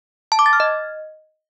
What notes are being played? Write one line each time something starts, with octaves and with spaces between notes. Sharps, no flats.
A5
D6
A6
F6
D#5